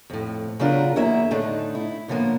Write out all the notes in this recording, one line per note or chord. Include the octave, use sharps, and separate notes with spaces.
F2 A2
C#3 F#3 B3 D4 F4 A#4
E2 F#3 A#3 E4 G#4 E5
A2 D3 A3 D4 D#4
E4
A2 D3 F3 G3 A#3 B3